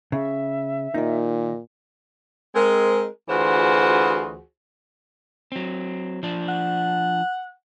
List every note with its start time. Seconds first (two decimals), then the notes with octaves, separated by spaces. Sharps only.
0.12 C#3 E5
0.94 A#2 D#3 D#4
2.55 G#3 C4 A#4
3.29 D2 E3 F4 F#4 G#4 C5
5.52 F#3 C4
6.23 F3 D4
6.49 F#5